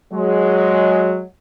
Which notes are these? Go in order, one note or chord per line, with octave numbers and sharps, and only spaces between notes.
F#3 G#3